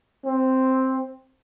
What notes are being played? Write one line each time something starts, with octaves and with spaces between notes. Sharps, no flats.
C4